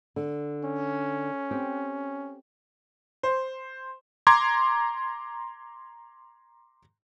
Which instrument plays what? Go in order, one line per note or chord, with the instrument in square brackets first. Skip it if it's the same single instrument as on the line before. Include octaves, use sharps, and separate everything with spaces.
[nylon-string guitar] D3
[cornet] C#4
[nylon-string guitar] C4 G4
[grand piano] C5
[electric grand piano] A#5 C6 D6 G#6